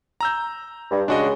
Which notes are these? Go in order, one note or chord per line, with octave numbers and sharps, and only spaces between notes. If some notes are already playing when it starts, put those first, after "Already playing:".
A#5 E6 G6
G2
C#3 G#3 D4 F#4 D#5